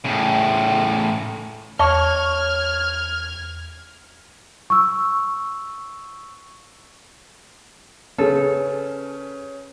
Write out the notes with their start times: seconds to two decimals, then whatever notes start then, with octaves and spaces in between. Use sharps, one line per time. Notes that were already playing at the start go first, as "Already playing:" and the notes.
0.05 A2 C#3
1.79 E2 C#5 A5 F6 G#6
4.70 C#6 E6
8.18 C#3 C#4 G#4 A4 B4